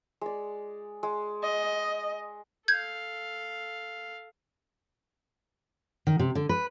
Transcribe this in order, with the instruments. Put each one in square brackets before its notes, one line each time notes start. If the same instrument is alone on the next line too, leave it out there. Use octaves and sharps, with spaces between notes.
[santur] G#3 D5
G#3
[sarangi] D#5
[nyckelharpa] A4 F5 [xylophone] G6 G#6
[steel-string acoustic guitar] D#3
C3
D3
B4